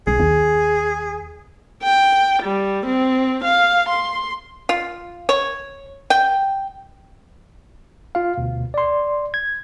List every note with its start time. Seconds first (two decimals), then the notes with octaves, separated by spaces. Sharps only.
0.07 B1 G#4
0.20 D#2
1.83 G5
2.43 G3
2.86 C4
3.44 F5
3.89 C6
4.69 F4
5.29 C#5
6.10 G5
8.15 F4 F5
8.38 D2 B2
8.74 D5 C6
9.34 G#6